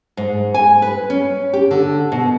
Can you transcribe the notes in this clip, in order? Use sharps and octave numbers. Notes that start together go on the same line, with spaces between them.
G#2
G#5
B4
C#4
G4
D3
B2